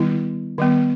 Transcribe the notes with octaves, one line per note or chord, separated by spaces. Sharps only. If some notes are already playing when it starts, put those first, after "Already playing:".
Already playing: D#3 G3 B3 E4
D#3 G3 B3